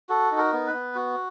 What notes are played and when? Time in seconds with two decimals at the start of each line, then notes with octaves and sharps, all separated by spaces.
0.09 F#4 A4
0.31 D#4
0.38 A#4
0.53 B3
0.67 B4
0.73 B3
0.95 F#4